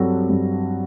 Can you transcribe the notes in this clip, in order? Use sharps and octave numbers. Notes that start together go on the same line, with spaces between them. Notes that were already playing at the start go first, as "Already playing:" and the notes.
Already playing: G2 F#3 C4 F#4 A4
G2